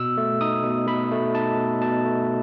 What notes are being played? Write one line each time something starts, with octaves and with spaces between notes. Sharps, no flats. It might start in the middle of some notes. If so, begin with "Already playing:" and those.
Already playing: B2 E6
A3
D#4 D#6
B2
B2 B5
A3
D#4 A5
B2
B2 A5
A3